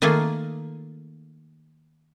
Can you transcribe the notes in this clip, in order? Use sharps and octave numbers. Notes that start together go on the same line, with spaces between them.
D#3 A3 A#3 F4 G#4